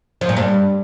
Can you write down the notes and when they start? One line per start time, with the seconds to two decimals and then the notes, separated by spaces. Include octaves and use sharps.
0.21 F3
0.29 A#2
0.37 G2